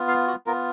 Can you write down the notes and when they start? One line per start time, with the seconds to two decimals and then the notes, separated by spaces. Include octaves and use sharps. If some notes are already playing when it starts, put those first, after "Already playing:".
Already playing: B3 F4
0.08 F5
0.27 F#4
0.46 B3 F4 A#4